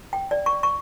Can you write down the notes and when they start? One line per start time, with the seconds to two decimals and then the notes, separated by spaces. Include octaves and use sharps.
0.13 G5
0.31 D5
0.46 C#6
0.63 C#6